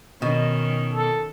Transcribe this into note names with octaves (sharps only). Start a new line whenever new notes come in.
B2 D#3 C#4
A4